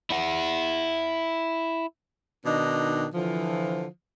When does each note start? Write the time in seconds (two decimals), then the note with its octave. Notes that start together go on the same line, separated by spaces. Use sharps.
0.10 E4 F#5
2.45 B2 D#3 D4 D#4
3.13 D3 E3 F3